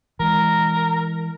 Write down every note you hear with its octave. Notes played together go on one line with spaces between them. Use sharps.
E3 G#3 A#4